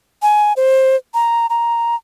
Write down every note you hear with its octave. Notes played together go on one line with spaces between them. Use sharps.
G#5
C5
A#5
A#5